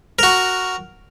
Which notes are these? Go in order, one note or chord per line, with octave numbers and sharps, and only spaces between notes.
F#4 A#4